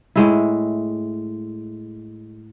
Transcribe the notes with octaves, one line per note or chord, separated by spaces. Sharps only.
A2 G#3 E4